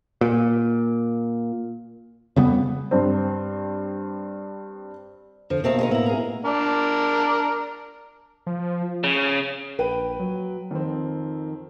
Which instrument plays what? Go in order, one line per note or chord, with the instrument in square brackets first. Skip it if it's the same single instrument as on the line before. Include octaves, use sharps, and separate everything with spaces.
[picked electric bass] A#2
F2 C#3 G3 B3
[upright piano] G2 C4
[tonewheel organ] F2 D3 [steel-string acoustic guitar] F3
[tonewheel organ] B2 A#3 [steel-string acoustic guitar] D#3 A3 C4
[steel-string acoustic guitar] G#3 C#4 D#4
[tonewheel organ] A2 A#3 B3 [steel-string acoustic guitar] E4 A#5
[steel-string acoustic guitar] G#4 A#4
[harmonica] D4 A#4 D5
[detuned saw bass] F3
[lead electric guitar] C#3
[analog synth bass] A#1 [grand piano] B4 G5 D#7
[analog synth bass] F#3
[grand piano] F2 C4 [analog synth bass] D#3